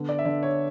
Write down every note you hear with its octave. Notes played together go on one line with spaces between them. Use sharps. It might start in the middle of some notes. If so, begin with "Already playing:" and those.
Already playing: D3 B3
D5
E5
D3 D5
C#5